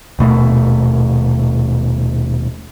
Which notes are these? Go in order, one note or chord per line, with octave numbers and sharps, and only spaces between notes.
D#1 B2 A3